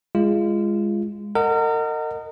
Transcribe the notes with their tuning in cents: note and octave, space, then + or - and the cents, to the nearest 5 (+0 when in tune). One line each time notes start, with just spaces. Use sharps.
G#3 -10 F4 -30
A#4 -35 D#5 -5 F#5 +0